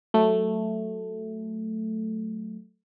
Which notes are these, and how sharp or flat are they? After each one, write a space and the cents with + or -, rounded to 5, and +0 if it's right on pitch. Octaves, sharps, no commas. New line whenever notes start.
F#3 +0 A3 +0